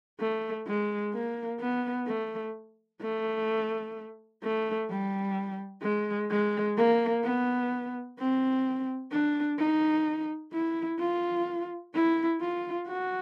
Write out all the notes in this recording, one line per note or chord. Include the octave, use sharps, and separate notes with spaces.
A3
G#3
A#3
B3
A3
A3
A3
G3
G#3
G#3
A#3
B3
C4
D4
D#4
E4
F4
E4
F4
F#4